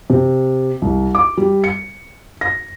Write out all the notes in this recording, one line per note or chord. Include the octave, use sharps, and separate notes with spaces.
C3
C2
D6
G3
C#7
A#6